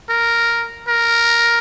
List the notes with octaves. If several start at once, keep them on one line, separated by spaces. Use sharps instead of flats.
A#4
A#4